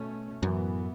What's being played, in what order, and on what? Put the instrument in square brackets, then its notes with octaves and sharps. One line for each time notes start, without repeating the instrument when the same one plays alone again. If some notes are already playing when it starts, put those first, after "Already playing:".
Already playing: [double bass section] B2 A3 C#4
[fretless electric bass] F#2 [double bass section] A2 E3 B3